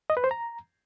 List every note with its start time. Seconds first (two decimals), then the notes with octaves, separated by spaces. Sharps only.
0.10 D#5
0.17 B4
0.24 C5
0.31 A#5